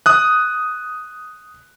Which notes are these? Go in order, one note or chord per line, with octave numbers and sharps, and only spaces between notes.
D#6 F#6